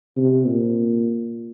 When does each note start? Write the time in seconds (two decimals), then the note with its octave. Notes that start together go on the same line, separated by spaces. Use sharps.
0.17 C3
0.46 A#2